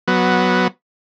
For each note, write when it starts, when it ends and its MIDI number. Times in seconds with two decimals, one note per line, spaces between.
0.08 0.68 54
0.08 0.68 59